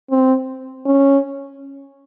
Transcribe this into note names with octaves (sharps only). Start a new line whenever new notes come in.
C4
C#4